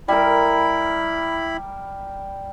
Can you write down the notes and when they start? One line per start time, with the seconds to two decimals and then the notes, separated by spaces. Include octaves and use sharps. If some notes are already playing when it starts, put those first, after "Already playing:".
0.08 G3 E4 A#4 B5